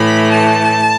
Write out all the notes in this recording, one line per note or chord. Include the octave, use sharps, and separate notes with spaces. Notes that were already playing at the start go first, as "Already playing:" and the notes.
Already playing: A2 E3 A3 B5
A5